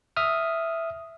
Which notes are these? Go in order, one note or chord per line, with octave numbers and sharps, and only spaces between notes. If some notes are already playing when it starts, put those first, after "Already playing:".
E5 D#6 F6